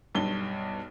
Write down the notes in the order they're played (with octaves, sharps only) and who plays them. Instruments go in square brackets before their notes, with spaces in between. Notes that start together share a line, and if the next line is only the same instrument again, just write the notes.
[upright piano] B1 G2 G7